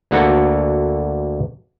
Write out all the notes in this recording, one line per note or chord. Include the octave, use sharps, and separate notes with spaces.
D2 A#3 F#4 A4 F#5 A#5